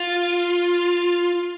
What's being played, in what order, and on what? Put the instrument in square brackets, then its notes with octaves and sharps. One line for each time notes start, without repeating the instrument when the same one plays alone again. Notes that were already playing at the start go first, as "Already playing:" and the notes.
Already playing: [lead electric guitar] F4